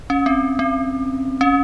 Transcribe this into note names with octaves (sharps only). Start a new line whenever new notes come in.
C#4
C4
C4
C#4